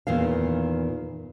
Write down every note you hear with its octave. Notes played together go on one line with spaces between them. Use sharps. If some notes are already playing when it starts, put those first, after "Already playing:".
E2 A#2 D#3 F5